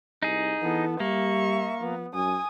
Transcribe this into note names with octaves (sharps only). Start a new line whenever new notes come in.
C2 D#4 G#4
E3 B3 A4
G3 A#3 E5 C#6
F3 B3
F#2 G#5 D#6